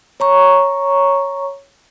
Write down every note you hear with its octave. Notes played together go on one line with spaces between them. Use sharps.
C#5 A#5 C#6